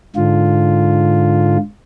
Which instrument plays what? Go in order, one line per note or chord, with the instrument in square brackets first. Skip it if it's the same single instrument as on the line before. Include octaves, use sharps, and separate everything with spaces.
[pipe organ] G#2 D3 F4